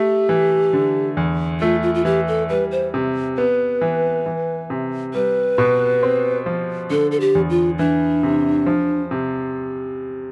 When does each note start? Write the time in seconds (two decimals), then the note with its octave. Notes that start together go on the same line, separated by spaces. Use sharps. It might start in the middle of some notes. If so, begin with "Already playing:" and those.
Already playing: A3 G4
0.29 E3
0.73 D3
1.17 E2
1.61 A3 F4
1.83 F4
1.95 F4
2.05 E3 G4
2.28 A4
2.49 G3 B4
2.71 C5
2.94 C3
3.38 B3 B4
3.81 E3
4.26 E3
4.70 C3
5.14 G3 B4
5.58 B2
6.03 C4
6.46 F3
6.90 D3 A4
7.11 A4
7.20 G4
7.35 E2
7.50 F4
7.78 E3 D4
8.23 C3
8.66 F3
9.11 C3